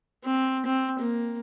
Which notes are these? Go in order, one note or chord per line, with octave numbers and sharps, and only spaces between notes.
C4
C4
A#3